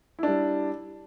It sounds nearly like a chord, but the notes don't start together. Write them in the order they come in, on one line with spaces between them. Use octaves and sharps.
E4 D4 G3